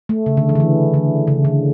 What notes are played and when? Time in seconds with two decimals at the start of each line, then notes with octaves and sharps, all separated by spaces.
0.09 A3
0.26 C#3
0.37 D3
0.49 E3
0.55 D3
0.60 E3
0.94 D3
1.27 C#3
1.45 D3